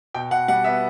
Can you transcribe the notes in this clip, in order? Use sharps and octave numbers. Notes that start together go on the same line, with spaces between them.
B2 G5
B2 F#5
G3 F#5
B3 E5